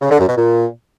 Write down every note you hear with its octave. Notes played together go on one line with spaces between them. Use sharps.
C#3
D3
F#2
B2
A#2